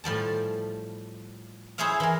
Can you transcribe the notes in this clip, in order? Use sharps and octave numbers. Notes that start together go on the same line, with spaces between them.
A2 F3 G3 A5
E4 G#4 C5 C#5 E5 F5
E3 A#4